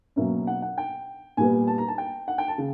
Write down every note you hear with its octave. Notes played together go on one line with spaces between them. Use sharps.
B2 F#3 A#3 C#4 E5
F#5
F#5
G5
A#2 G3 B3 G#5
A5
A#5
A5
G5
F#5
G5
A5
C#3